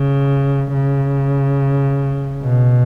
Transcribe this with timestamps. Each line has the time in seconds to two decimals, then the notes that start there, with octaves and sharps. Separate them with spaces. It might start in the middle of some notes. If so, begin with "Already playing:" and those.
Already playing: C#3
0.73 C#3
2.42 B2